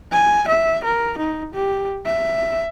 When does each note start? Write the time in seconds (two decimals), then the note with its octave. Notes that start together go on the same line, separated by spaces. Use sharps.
0.12 G#5
0.48 E5
0.84 A#4
1.18 D#4
1.54 G4
2.06 E5